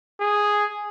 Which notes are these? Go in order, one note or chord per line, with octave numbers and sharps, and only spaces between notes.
G#4